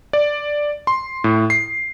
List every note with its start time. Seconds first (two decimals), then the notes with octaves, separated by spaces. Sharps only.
0.13 D5
0.87 C6
1.24 A2
1.50 C7